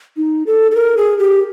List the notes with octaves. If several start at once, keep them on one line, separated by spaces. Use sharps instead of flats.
D#4
A4
A4
A#4
G#4
G4